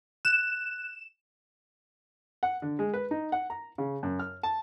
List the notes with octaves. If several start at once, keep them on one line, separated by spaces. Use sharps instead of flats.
F#6 E7
F#5
D3
G#3
B4
D#4
F#5
A#5
C#3
F#2
F6
A5